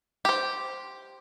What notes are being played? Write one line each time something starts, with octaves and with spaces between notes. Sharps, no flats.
G4 C5